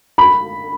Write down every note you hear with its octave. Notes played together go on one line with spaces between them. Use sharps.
B5